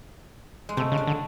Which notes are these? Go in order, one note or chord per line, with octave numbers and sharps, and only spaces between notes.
G#3
C3 A3
C#3
D4
D3